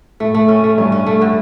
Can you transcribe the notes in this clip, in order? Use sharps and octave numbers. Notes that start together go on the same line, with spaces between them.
A2 A3
A3
C#4
A3
G2 C#4
C#4
A3
D3